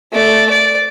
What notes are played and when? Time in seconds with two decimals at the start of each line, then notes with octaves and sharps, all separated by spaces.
0.12 A3 D5
0.51 D5